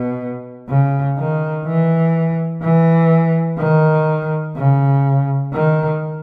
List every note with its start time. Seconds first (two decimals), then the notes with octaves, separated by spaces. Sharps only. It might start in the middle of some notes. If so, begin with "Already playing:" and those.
Already playing: B2
0.69 C#3
1.17 D#3
1.66 E3
2.62 E3
3.59 D#3
4.56 C#3
5.53 D#3